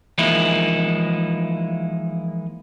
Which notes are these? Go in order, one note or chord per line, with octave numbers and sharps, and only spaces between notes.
E3 F3 G#3 A#3 D#4 E4